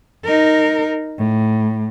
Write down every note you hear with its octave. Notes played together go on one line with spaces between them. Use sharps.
D#4 A#4
A2